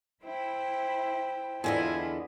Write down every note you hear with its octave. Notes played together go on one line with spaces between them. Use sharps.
E4 C5 G5
E2 D3 E4 F4 D#5 G#5